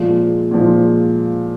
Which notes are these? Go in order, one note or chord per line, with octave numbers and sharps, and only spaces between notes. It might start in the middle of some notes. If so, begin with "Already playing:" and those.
Already playing: A#2 F3 G#3 F4
A#2 F3 G#3